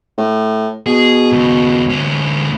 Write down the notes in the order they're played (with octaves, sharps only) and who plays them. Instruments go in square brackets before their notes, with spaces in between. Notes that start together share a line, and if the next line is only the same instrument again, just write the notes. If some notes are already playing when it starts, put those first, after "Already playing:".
[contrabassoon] A2
[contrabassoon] B2 [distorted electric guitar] G#4
[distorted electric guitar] D#2 C#3
D2 C#4